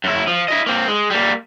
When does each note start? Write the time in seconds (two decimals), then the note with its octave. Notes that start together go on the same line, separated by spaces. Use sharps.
0.04 F#2 E4
0.27 F3
0.48 E4 D#5
0.66 A#3 C4
0.88 G#3
1.10 G3 A#3